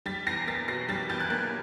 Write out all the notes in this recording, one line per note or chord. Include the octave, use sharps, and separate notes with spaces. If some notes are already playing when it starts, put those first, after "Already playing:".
G3 A6 B6
E2 A#6 C7
A#3 A6 B6
B2 A#6 C7
G3 A6 B6
E2 G6 A6
F#6 G#6
A#3